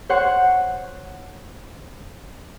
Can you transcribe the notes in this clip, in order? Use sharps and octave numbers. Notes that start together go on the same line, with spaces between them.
C5 C#5 F#5 C6